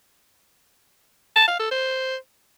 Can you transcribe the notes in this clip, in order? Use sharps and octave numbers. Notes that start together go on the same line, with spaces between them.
A5
F5
A4
C5